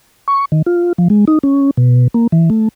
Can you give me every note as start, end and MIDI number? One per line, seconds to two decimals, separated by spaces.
0.28 0.45 85
0.52 0.62 51
0.66 0.93 65
0.98 1.08 53
1.10 1.25 56
1.28 1.38 63
1.43 1.71 61
1.77 2.07 47
2.14 2.27 58
2.32 2.50 52
2.50 2.68 57